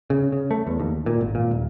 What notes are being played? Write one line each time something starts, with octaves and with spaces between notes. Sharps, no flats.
C#3
C#3
A3
E2
D#2
A#2
G#1
A#2
D#1